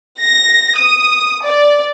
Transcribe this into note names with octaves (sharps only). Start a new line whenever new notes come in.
A#6
D#6
D5